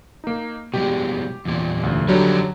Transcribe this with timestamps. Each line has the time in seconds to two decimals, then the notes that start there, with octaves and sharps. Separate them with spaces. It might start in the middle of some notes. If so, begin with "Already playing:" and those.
0.24 A#3 D#4
0.74 B2 G3 G#3 G4
1.45 E2 A#2 G3
1.83 D2
2.08 F2 D3 F#3 G3 D#4 C#5